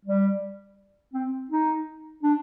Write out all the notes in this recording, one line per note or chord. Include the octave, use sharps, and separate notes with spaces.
G3
C4
D#4
D4